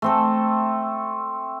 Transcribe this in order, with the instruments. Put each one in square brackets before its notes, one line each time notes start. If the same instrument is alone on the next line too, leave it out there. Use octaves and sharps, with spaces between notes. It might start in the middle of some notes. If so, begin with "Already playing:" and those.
[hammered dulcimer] A3 C4 A4